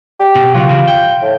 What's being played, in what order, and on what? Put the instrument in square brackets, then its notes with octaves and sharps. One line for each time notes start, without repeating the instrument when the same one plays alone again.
[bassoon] G4
[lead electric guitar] B2
[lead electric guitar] C#3 F#3 [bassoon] F4
[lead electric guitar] C#3 E3
G5
[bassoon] A2